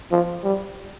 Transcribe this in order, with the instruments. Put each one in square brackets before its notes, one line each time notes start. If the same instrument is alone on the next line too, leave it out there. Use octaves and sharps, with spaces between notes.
[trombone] F3
G3